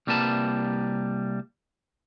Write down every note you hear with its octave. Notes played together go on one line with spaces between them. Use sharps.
C2 G3 A#3 B4 A5